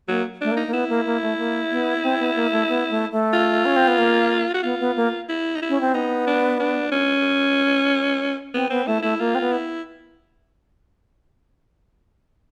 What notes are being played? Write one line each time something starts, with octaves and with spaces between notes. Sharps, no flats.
F#3 A#3
A3 D4
A#3
D#4
A#3
B3 E4
A#3
A#3
A3
A#3
B3
C4
B3
A#3
A3
B3
A3
A3
F4
C#4
C4
B3
A#3
F#4
B3 F4
B3
A#3
E4
D#4
E4
C#4
C4
B3 D#4
D4
D4
C#4
B3 C4
B3 C4
A3 E4
A3 E4
A#3 F4
C4
B3
E4